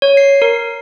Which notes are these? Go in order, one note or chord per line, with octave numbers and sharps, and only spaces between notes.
C#5
C7
A#4